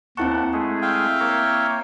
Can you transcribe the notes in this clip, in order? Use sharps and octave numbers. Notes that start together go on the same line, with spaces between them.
D#2 C4 E4 F#5 A5 C#6
G#3 A3 G#4
E5 F5 G5
A#3 A#4 C#5